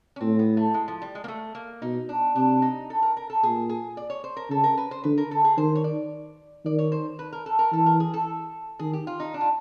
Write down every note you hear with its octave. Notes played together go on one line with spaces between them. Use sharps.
C#4
A2 C4
B3
A3
G#3
F3
G3
G#3
A#3
A3
A#3
B2 D#4
D4
C3 D4
D#4
A4
A#4
A#4
A4
A#2 G#4
G#4
D5
C#5
C5
A#4
C#3 A4
A#4
B4
C5
D3 B4
A#4
A4
G#4
D#3 C5
C#5
D5
D#3 D5
C#5
C5
B4
A#4
A4
A#4
E3 A4
A#4
G#4
A4
D#3 G#4
G4
F4
D#4
D4
F4